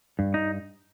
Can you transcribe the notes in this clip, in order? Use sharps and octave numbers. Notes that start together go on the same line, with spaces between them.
G2
D#4